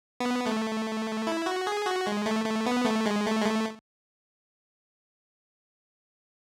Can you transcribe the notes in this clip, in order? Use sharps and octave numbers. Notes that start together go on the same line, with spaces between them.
B3
A3
E4
F#4
G#4
F#4
G#3
A3
A3
B3
A3
G#3
A3
G#3
A3